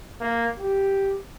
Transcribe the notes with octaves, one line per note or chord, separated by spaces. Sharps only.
A#3
G4